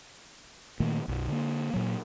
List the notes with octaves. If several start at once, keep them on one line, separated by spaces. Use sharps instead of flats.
A#2 D#3 A3 A#3
B1 F#2
D3 A#3
A#2 F#3